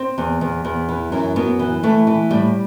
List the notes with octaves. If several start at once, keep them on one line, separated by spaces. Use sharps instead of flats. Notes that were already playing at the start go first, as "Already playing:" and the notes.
Already playing: C4
E2
E2
E2
E3
F#2
F#2 B3
E3
E3 A3
E3
A2 G3